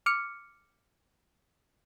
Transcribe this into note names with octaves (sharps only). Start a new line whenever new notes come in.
D6 F6 C#7